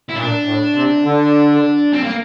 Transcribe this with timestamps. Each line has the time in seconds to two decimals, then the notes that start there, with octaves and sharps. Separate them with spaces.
0.09 E4
0.16 A#2 D4
0.45 A2
0.75 C3
1.04 D3
1.93 C4
2.04 A#3